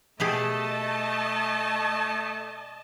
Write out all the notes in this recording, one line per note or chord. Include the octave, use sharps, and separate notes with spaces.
B2 A3 G4 G#4 D#5 A5